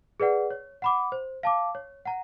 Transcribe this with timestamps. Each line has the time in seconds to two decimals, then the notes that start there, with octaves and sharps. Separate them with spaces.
0.20 G#4 B4 D5 F#5
0.51 C#5
0.82 F#5 B5 D6
1.12 C5
1.43 F5 A5 D6
1.75 C#5
2.05 F#5 A#5